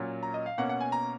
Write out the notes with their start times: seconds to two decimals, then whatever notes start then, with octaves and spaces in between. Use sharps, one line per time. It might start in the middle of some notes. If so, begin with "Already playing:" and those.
Already playing: A#2 F#3 C#4
0.23 A#5
0.34 D#5
0.46 F5
0.58 B2 A#3 C#4 F#5
0.69 F#5
0.81 G#5
0.92 A#5